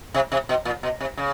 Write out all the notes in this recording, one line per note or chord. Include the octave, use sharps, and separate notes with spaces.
C3
C3
B2
A#2
B2
C3
C#3